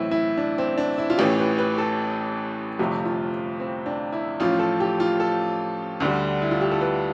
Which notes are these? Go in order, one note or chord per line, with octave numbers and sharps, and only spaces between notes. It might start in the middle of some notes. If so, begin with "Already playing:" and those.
Already playing: B1 A2 E3 C4 E4
E4
D4
C4
D4
E4
F4
A1 A2 E3 G4
B4
B4
A4
G1 F2 C3 F3 A3 G4
F4
C4
D4
E4
A1 A2 F3 F4
A4
G4
F4
A4
D2 D3 G3
E4
F4
G4
A4
B4